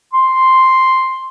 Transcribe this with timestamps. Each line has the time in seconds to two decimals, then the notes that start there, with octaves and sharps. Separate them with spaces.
0.13 C6